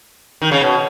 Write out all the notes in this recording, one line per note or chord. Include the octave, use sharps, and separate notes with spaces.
D#3
C#3
B2